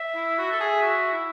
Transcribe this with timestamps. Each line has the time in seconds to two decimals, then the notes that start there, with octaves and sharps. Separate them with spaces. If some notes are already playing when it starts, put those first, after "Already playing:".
Already playing: E5
0.15 E4
0.38 F#4
0.52 A4
0.60 G#4
0.82 F#4
1.12 E4